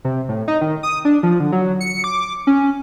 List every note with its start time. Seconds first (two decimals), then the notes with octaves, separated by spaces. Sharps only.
0.05 C3
0.29 A2
0.48 D#4
0.61 D#3
0.83 D#6
1.05 D4
1.23 F3
1.40 D3
1.52 F#3
1.81 C#7
2.04 D6
2.47 C#4